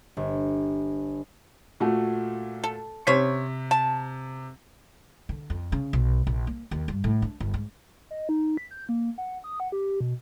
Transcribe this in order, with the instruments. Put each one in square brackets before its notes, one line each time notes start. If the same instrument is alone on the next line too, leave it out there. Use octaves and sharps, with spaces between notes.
[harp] G1
[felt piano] A#2 A3 F#4
[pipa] A4
[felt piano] C3 B6 [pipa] C#4 C5 C#5
[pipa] A5
[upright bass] D3
F2
C#3
B1
A#1
A#3
D#2
G2
A2
D4
G1
G#2
[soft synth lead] D#5
D#4
B6
G6
A#3
F#5
D#6
F#5
G4
B2